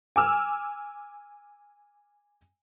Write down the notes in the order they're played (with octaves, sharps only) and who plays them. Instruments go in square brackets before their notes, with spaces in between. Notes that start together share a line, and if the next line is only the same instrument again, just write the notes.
[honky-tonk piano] G#5 D6 E6 F6